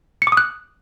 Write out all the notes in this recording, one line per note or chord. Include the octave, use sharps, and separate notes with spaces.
C#7
D6
D#6
F#6